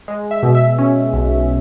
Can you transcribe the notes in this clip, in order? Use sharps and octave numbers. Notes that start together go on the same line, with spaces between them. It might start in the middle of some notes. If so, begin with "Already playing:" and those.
G#3
E5
B2
E5
C#4
B1